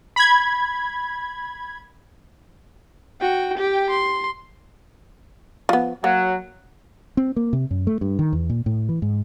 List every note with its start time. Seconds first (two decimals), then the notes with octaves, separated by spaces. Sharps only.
0.16 B5 G#6
3.21 F#4 G5
3.58 G4 G5
3.90 C6
5.69 F3 B3
6.04 F#3 A#3
7.17 C4
7.36 A#3
7.53 C3
7.71 F#2
7.87 A3
8.01 G2
8.19 D#3
8.33 E2
8.50 A#2
8.66 A2
8.89 E3
9.02 G#2